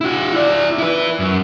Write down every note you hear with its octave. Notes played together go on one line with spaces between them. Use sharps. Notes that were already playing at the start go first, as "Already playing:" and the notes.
E4 F#4
E4 D5
E4 B4
F#2